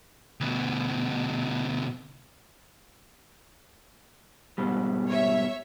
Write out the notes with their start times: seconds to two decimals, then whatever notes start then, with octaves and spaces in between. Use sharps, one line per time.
0.41 D2 B2
4.58 G#2 B2 G3
5.08 C#5 E5